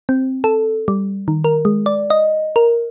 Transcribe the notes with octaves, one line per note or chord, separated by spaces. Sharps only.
C4
A4
G3
D#3
A#4
G#3
D5
D#5
A#4